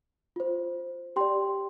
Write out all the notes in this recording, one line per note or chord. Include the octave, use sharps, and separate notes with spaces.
F4 C5
G4 D5 G5 C6